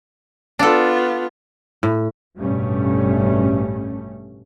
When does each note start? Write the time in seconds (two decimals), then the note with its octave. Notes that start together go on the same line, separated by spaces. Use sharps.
0.59 B3 D4 F4 A4
1.83 A2
2.36 A1 G2 B2 G3 A3 C#4